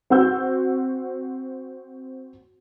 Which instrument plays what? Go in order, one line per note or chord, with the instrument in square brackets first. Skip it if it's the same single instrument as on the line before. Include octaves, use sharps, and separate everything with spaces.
[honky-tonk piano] C4 F#4 F#5 E6 G6